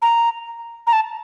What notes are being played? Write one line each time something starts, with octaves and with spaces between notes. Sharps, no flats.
A#5
A#5
A5